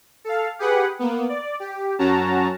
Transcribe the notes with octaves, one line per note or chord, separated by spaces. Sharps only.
A4 F5
G4 G#4 B4 F#5
A#3 B3
D5
G4
F#2 C#4 F#4 A5 A#5